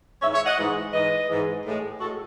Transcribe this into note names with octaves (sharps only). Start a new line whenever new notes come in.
G#2 E3 G#3 C#5 E5
C#5 E5
D#5 F#5
G#2 E3 G#3
G#2 E3 G#3 B4 D#5
G#2 E3 G#3
A2 G#3
A2 G#3 F#4 A4